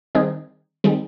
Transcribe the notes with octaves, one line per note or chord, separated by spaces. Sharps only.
D#3 G3 C4 D#4 G#4
D#3 G3 C4 D#4 G#4